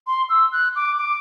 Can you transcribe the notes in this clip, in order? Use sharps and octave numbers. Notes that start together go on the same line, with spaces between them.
C6
E6
F#6
D6
D6